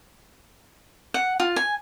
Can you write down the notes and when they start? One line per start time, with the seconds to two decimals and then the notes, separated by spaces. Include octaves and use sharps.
1.14 F#5
1.40 F4
1.56 G#5